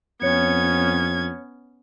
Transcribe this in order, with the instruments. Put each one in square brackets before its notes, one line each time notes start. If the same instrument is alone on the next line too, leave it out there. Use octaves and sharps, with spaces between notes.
[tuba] F2 [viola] B3 C#4 [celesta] C#5 C#7 [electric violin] G#6